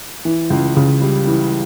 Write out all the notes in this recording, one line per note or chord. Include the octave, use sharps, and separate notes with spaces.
E3
C#2
C#3
G3
E3